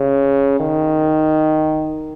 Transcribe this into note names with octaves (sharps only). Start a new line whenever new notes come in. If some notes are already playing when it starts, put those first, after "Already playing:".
Already playing: C#3
D#3